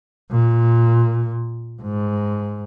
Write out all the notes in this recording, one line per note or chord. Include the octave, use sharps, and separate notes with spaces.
A#2
G#2